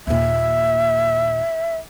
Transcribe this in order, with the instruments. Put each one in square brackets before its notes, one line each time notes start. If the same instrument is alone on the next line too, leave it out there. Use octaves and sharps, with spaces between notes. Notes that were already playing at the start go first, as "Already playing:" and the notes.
[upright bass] D#2 A#2 [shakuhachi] E5